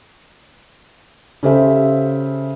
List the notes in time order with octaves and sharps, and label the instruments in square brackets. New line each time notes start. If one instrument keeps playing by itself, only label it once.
[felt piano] C#3 G4 A4 C5 E5